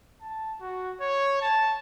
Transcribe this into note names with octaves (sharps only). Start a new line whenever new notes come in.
A5
F#4
C#5
A5